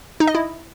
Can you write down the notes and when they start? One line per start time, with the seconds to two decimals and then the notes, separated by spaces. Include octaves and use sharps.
0.20 D#4
0.27 D#5
0.35 E4